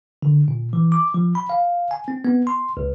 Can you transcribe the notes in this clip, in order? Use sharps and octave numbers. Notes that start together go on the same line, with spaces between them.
D3
A#2
E3
D6
F3
B5
F5
G#5
C4
B3
C6
C#2